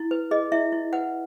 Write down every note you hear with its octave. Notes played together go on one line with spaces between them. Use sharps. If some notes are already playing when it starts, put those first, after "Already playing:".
Already playing: E4
B4
G#4 D#5
E4 E5
E4
B4 F#5